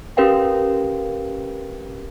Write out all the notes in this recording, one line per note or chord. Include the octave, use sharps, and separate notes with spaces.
C#4 G4 A#4 B4 F5 G5